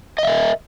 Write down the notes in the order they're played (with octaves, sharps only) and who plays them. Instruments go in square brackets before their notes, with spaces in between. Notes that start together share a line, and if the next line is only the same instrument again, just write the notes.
[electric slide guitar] D#5
E5
A#4